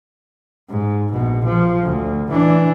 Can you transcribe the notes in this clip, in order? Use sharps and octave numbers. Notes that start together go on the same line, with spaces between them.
G#2
A#1 B2
F3
D2
E3 D4